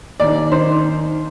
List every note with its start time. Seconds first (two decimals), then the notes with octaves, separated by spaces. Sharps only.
0.20 D#2 D#3 D5
0.52 D#3 C5